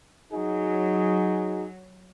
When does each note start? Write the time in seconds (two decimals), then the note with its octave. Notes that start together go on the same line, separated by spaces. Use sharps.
0.33 F#3 D#4 F#4 G#4